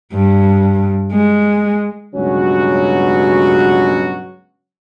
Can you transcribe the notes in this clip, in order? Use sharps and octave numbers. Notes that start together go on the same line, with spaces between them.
G2
G#3
C#2 G2 B2 F#3 C#4 F#4